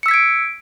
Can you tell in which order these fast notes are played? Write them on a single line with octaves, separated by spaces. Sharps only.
C#7 E6 B6 G#6 D7